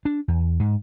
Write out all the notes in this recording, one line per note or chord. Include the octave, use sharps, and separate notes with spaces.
D4
E2
G#2